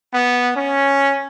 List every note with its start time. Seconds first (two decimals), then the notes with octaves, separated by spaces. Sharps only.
0.13 B3
0.56 C#4